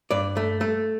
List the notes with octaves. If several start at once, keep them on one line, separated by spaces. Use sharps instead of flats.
G2 D5
A3
A3